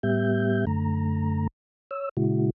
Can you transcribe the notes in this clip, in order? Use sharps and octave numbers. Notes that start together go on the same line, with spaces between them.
A2 G3 B3 G4 E5 G6
F#2 D3 A3 A#5
C#5 E6
A#2 C#3 G#3 E4 F#4